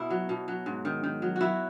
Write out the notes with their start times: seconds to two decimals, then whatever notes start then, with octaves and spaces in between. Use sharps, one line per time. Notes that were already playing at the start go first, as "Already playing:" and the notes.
Already playing: B2 E4
0.10 F#3
0.29 B2
0.48 F#3
0.66 G#2
0.85 D#3
1.03 D#3
1.22 F#3
1.36 F#3 E4 F#4